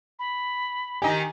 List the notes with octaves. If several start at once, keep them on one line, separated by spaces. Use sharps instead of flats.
B5
D#3 D#4 G4 G#5